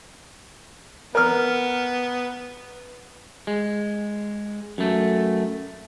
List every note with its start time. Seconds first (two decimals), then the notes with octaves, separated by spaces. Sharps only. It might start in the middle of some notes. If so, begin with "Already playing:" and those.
1.15 B3 A#4 F6
3.47 G#3
4.78 F#2 A3